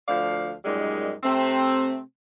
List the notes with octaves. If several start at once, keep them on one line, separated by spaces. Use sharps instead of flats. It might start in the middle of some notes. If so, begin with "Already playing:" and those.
D2 F3 D5 F5
F#2 A#2 G3 G#3 D#4
C3 A3 C4